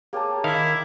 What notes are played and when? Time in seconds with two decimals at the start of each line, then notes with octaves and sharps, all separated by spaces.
0.13 A#3 G4 G#4 C#5 A5
0.44 D#3 E4 F5 D#6 E6